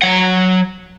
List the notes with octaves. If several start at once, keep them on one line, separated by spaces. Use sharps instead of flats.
F#3 F#5